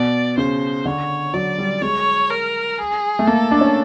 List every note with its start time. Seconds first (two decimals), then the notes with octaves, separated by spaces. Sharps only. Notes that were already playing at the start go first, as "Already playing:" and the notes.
Already playing: B2 D5
0.38 C#3 C5
0.85 D3 C#5
1.34 F#3 D5
1.58 G3
1.82 G#3 C#5
2.30 A#4
2.78 G#4
3.19 A3
3.27 A#3 A4
3.51 D4
3.61 C#4